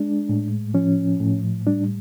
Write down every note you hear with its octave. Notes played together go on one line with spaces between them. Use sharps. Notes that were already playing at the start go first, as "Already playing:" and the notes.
Already playing: G#3 D4
A2
F3 C#4
A2
G3 D4